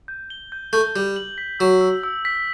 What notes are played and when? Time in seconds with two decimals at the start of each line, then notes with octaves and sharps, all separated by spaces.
0.08 G6
0.30 G7
0.52 G6
0.73 A3 G6
0.95 G3 G6
1.16 F#7
1.38 B6
1.60 F#3 E6
1.81 E6
2.03 E6
2.25 B6